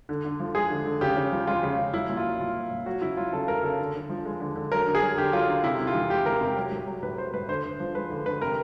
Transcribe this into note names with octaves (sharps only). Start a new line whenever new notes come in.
D3
D3
F3
G#3 G#4
D3
D3
C#3 G4
C#3
F3
G#3 F4
C#3
C#3
F#3 E4
A#2
F4
F#3
A#2 F4
F#3
A#2
F#3 F#4
C#3 E4
F#3 F4
C#3 A4
F#3 A#4
C#3 A4
D3
D3
F3
G#3
D3
D3
F#3 A#4
D3
G#4
F#3
D3 G4
F#3 F4
D3
C3 E4
C3
F4
E3
G#3 G4
C3 A#4
C3
F#3
A2
F#3
A2 B4
F#3 C5
A2 B4
D3 C5
D3
F3
G#3 B4
D3
D3 B4
C3 A#4